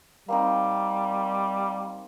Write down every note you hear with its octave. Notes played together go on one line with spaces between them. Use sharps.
G3 A#3 C4 D#4